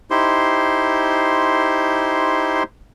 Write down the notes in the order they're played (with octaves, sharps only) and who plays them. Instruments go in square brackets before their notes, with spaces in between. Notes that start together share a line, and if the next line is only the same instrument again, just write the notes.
[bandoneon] D#4 E4 G4 C5 C6